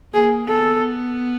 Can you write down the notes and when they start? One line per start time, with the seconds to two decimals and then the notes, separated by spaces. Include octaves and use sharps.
0.14 A#3 G#4
0.48 B3 A4